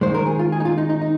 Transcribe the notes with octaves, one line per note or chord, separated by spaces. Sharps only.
D#3 G#3 C5
A#4
G#4
F4
G#4
D#4
F4
D#4
D#4
D#4